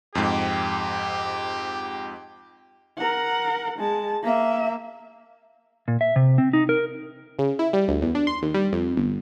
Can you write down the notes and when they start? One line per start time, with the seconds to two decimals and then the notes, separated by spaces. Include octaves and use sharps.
0.15 F2 G#2 G4
2.98 A#4 F#5
3.79 G#3 A5
4.23 A#3 E5
5.88 A#2
6.01 E5
6.16 C3
6.38 C4
6.53 D#4
6.69 A#4
7.39 C#3
7.59 E4
7.73 G3
7.88 D2
8.02 E2
8.15 D4
8.27 C6
8.43 D#2
8.54 G3
8.73 F2
8.97 G1